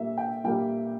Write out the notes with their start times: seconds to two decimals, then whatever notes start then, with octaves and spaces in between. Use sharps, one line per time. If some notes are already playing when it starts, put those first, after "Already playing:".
Already playing: A#2 G3 A#3 E5
0.18 G5
0.44 A#2 G3 A#3 G5